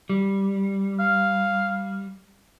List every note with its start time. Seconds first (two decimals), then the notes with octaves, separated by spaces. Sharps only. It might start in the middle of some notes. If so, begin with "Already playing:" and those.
0.09 G3
1.00 F5